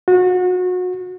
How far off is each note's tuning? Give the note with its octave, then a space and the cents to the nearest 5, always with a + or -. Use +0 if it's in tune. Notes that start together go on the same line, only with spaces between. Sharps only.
F#4 -30